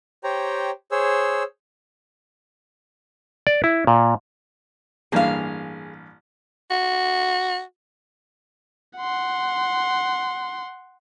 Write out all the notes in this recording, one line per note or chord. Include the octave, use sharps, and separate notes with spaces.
G4 C5 C#5 G5 A#5
G#4 C5 C#5 E6
D5
E4
A#2
A1 G2 A#3 G#4 F5
F#4
F#5 C6